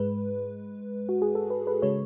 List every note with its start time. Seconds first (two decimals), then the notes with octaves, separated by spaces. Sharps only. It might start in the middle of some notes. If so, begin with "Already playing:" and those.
Already playing: G#2 G#3 B4
1.09 F#4
1.22 G#4
1.35 A4
1.50 B4
1.67 B4
1.82 C#3 G#3 C#5